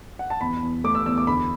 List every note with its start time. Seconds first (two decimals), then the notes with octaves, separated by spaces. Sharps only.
0.19 F#5
0.30 A5
0.41 E2 B5
0.63 E2
0.84 A3 D6
0.95 E6
1.06 E2 E6
1.18 D6
1.27 D2 B5